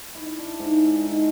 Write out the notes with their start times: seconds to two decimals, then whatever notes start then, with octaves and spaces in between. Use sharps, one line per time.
0.15 E4
0.27 E5
0.38 D4
0.59 G#2
0.86 E5
1.00 D#4
1.15 A5